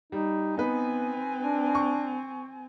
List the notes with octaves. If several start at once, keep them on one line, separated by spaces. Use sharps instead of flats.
G3 D#4
B3 C4 D#4 B4 G#5
D4
C#6